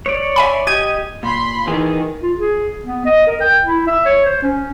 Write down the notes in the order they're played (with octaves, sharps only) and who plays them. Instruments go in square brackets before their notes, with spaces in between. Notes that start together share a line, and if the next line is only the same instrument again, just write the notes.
[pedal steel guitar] C#5 D5
[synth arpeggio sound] E5 G#5 B5
[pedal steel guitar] G4 D#5 G#5 [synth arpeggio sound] G#6
[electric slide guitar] A#2 [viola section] B5 C6
[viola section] D#3 [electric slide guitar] E3 G#4
[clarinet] F4
G#4
B3
D#5
A#4
G5
E4
E5
C#5
C5
C#4